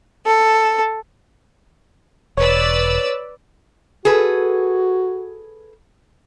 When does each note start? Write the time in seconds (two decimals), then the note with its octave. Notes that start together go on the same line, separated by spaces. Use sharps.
0.25 A4
2.37 E1 B4 C#5 D5 E6
4.05 F#4 G#4 A4 B4